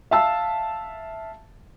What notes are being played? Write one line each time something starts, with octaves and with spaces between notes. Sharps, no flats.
E5 F5 A5 E6